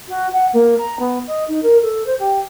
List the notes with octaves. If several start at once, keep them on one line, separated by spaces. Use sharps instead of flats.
F#4
F#5
A#3
A#5
B3
D#5
D#4
A#4
A4
C5
G4